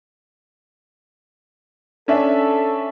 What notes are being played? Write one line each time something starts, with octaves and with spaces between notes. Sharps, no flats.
C#4 D4 A4 E5